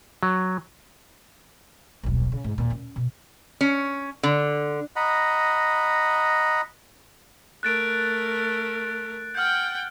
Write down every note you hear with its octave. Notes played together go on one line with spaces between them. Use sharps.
F#3
D#1 B1
C#3
G#2
D#2 A#2
C#4
B2
C#4
D3
D#5 F#5 A#5 B5
A3 A#4 F#6 A6 D7
F#5 G5 F6 G6